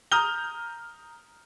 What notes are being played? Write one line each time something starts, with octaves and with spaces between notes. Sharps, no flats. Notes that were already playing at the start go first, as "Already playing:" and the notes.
A#5 D#6 F6 G6 G7